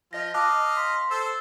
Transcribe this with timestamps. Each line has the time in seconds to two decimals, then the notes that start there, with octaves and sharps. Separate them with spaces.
0.13 F3 F4 D#5 A#6
0.34 D#5 F5 A5 D6 F#6
0.76 C6 B6
0.94 C6
1.11 A4 C5 E6